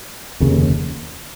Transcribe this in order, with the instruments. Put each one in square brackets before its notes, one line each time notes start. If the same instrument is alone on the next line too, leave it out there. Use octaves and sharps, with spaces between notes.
[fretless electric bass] F1 D#2 C#3